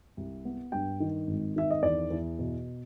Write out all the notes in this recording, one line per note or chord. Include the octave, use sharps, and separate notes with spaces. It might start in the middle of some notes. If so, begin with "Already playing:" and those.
C2
B3
G2 G5
D#3
G#1
D#3 E5
D#5
E2 D5
E2
B2